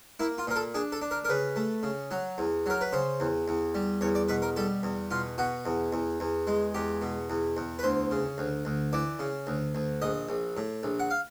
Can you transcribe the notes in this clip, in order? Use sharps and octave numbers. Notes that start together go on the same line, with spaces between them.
A#3 E4
F4
A#2 A#4
A4
D4 G#4
A4
D4
A#4
A#4
C#3 B4
A3
C#3
F#3
E2
F#3 A#4
B4
C#3 C5
E2
E2
G3
E2 C#5
D5
B2 B4
A#4
G3 A4
E2
B2 F4
B2 F#4
E2
E2
E2
G#3
E2 G4
B2
E2
E2
B4
D2 C5
C#3
D2
D2
E3 D5
C#3
D2
D2
A#1 D#5
A#1
A2
A#1
F#5
F5